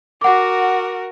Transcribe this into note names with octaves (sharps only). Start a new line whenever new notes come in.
F#4 A#4 F#5 D6